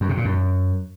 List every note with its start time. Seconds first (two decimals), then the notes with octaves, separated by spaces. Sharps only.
0.01 F#2
0.09 C3
0.17 A#2
0.25 F#2